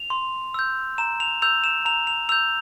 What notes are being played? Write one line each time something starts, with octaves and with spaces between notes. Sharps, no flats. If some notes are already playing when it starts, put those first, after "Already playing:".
Already playing: F7
C6
E6 G6
A#5 E7
F7
E6 G6 F7
E7
A#5 F7
F7
E6 G6 F7